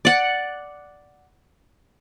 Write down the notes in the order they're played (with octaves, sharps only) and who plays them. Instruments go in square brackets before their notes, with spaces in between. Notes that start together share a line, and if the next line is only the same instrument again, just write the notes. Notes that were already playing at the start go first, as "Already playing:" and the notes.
[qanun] D5 F#5